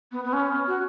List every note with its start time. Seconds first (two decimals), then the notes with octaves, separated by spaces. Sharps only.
0.12 B3
0.24 B3
0.33 C#4
0.67 F#4